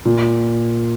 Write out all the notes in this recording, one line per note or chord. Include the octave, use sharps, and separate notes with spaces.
A#2